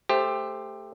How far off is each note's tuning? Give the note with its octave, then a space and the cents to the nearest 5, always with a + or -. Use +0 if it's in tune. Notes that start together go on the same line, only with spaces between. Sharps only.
A3 +0 G4 +20 C5 +0